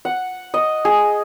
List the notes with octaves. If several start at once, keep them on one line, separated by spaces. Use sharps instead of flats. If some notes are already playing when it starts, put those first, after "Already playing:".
F#5
D#5
G#4